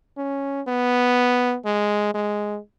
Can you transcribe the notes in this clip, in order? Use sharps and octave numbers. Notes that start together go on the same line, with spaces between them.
C#4
B3
G#3
G#3